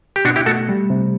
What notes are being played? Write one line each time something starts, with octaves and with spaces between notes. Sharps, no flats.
G4
B2 D4 F#4
E4 G4
A3 F#4 A4
G3
C3